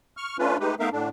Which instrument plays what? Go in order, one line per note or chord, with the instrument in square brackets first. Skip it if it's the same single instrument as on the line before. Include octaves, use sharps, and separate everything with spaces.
[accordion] C#6 F6
A3 C#4 D4 F4 B4
G#3 A3 D#4 G4 B4
A3 B3 D#4 A#4 E5 F5
A2 D3 D4